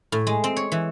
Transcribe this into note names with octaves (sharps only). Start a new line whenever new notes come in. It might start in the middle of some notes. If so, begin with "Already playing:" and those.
A2
G#3
C4
C#5
E3